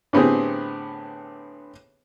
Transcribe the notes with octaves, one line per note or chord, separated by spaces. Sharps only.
A2 D3 B3 C4 G4 G#4